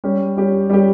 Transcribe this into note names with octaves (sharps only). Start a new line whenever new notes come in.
G3 C#4 G4
G3 C#4 G4
G3 C#4 G4